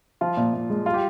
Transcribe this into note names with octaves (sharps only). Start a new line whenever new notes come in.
F3 F4
A#2
A#2
G#3
G3 F4
G4